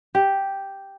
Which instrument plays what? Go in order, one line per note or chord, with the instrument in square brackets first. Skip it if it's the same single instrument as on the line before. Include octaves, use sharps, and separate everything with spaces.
[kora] G4